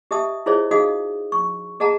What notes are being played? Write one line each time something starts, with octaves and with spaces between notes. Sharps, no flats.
G4 D#5 E5 A5 D#6
E4 F4 G#4 C5 C#5 D#5
D#4 F#4 G#4 D#5 F5 D#6
C#6
G#4 D#5 F#5 A5 A#5